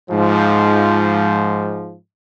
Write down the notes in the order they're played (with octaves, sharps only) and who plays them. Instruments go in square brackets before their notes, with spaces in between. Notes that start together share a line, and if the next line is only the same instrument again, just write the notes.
[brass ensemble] G#2 F3